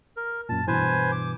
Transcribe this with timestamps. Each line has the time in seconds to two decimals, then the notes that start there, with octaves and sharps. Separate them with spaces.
0.17 A#4
0.49 F#2 A#2 A5
0.68 G2 B2 E3 B4 C5 G#5
1.12 D6